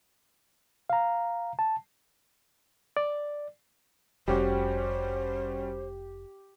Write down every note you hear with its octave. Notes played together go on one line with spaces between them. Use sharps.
F5 A#5
A5
D5
F1 G3 C#4 F#4 G4 C5